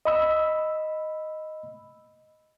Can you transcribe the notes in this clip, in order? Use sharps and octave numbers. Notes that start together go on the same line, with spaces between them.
D#5 B5 E6